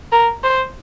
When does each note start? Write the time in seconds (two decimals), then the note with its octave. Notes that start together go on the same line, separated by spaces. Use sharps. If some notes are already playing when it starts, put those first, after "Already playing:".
0.12 A#4
0.44 C5